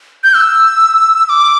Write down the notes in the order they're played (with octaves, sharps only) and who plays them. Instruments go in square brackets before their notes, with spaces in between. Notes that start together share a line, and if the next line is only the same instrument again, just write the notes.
[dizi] G6
E6
E6
D6